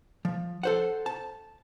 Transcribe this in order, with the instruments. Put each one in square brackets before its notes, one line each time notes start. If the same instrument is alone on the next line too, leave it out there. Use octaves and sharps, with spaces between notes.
[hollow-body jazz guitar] F3
A4 C5 F#5
A5